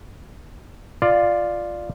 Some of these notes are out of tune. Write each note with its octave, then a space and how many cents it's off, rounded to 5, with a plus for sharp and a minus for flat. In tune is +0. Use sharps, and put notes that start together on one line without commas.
F4 +0 D5 +10